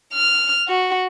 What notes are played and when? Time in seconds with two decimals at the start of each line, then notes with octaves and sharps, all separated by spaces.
0.14 F6
0.68 F#4